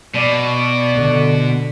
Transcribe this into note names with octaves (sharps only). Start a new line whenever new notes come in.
B2 D5
D3